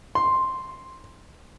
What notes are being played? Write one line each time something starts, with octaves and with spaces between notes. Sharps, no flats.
C6